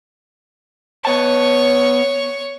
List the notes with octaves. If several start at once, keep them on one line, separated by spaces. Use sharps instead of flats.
B3 C#5 A5 C#6